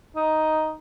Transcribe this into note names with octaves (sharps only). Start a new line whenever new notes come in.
D#4